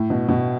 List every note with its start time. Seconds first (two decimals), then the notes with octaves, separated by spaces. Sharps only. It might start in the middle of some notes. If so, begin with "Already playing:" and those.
Already playing: A2
0.10 B2
0.28 B2